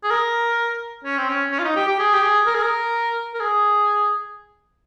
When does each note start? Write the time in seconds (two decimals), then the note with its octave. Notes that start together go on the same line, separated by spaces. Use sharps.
0.03 G#4
0.11 A#4
1.04 C#4
1.18 C4
1.29 C#4
1.52 C#4
1.59 F4
1.64 D#4
1.76 G4
1.87 G4
1.99 G#4
2.13 G4
2.22 G#4
2.46 A#4
2.55 G#4
2.63 A#4
3.34 A#4
3.41 G#4